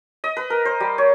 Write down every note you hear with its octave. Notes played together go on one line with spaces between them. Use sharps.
D#5
B4
A#4
C5
G3
C#5